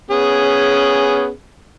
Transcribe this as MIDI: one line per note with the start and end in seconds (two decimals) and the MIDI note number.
0.11 1.29 59
0.11 1.29 61
0.11 1.29 68